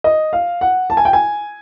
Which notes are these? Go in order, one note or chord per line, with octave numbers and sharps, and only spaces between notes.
D#5
F5
F#5
A5
G#5
G5
G#5